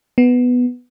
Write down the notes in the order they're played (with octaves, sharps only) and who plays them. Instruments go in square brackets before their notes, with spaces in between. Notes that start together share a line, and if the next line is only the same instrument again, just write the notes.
[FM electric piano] B3